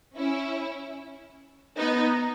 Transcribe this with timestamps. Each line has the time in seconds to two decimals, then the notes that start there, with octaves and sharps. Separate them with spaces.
0.16 C#4 E4
1.77 B3 D#4